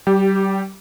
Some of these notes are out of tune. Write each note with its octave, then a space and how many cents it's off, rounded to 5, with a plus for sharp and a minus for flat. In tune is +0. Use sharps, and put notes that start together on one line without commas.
G3 -30 G4 +0